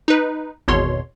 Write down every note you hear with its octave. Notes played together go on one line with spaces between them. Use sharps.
D#4 B4
G#1 E2 B2 C#5 C6